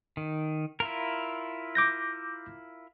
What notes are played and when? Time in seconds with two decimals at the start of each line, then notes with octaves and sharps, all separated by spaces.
0.17 D#3
0.80 E4 F4 A#4
1.75 D6 G6 A#6